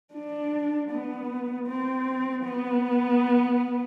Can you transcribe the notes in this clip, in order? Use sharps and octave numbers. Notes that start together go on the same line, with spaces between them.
D4
B3
C4
B3